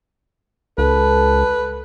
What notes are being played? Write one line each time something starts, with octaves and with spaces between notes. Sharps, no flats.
C#2 A4 B4